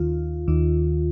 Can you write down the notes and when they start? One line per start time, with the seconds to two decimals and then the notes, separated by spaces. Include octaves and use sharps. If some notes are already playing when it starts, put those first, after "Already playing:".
Already playing: D#2 D#3 F4
0.48 D#2 D#3